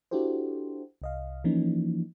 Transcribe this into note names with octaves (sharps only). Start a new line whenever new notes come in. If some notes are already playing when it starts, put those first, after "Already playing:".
D4 E4 F#4 G4 A4 C5
C2 D#5 F5
E3 F3 A#3 C#4 D#4